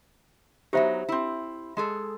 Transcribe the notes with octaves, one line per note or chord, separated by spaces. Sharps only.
F#3 B3 D#4 G4 C5 E5
C4 E4
G#3 G#4 A4